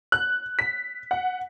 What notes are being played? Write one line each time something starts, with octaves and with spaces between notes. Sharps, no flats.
F#6
B6
F#5